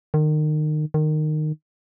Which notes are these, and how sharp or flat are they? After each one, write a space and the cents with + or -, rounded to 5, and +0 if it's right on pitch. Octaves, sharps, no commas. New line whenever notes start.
D#3 -30
D#3 -20